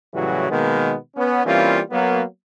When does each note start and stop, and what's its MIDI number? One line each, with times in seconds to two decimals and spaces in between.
0.14 0.46 45
0.14 0.46 49
0.14 0.46 52
0.14 0.46 54
0.14 0.46 55
0.14 0.46 66
0.50 0.94 47
0.50 0.94 51
0.50 0.94 56
0.50 0.94 58
0.50 0.94 59
1.16 1.42 59
1.16 1.42 61
1.44 1.79 52
1.44 1.79 55
1.44 1.79 58
1.44 1.79 60
1.44 1.79 61
1.44 1.79 65
1.90 2.22 54
1.90 2.22 58
1.90 2.22 59